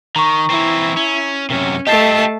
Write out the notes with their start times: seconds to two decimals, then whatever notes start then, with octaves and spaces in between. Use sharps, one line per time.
0.16 D#3 A#5 C#6
0.50 E3 C4 E4
0.97 C#4
1.50 F#2 C3 C#4
1.87 A3 G4 A4 D#5 A5 C7